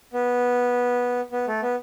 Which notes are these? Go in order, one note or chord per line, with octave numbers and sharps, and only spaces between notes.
B3
B3
A3
B3